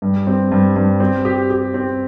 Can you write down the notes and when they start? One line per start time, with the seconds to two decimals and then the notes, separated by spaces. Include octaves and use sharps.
0.02 G2
0.27 C4
0.51 G2
0.76 G2
1.00 C4
1.25 G4
1.50 G4
1.74 C4